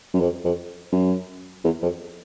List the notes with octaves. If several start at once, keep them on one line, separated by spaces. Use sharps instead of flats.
F#2
F2
F2
F#2
E2
F2